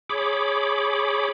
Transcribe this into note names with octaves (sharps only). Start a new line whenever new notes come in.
G#4 C#5 B5 D6